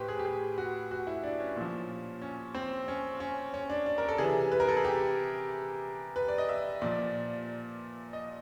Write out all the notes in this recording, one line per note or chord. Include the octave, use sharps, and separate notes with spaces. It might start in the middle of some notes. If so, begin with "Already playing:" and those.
Already playing: A2 G4 B4 C5
G#4
G4
G#4
F#4
F#4
E4
D4
C#4
A#2 F3
C#4
C4
C#4
C#4
C#4
D4
D4
A#4
A4
C3 E3 G#4
B4
A#4
A4
G#4
G4
B4
D5
D#5
E5
A#2 F3 D5
D#5